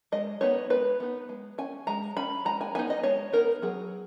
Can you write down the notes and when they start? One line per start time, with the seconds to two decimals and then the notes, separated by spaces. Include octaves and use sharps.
0.12 G#3 D#5
0.41 B3 D#4 C#5
0.70 G#3 B4
1.00 B3 D#4
1.29 G#3
1.58 C#4 G#5
1.87 G#3 A#5
2.17 C#4 B5
2.45 G#3 A#5
2.61 G#5
2.75 B3 D#4 G#5
2.90 D#5
3.03 G#3 C#5
3.33 B3 D#4 A#4
3.62 F#3 G#4